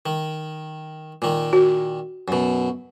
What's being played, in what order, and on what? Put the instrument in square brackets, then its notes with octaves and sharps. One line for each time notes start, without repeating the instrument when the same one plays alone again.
[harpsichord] D#3
A#2 D#3
[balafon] F#4
[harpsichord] F#2 B2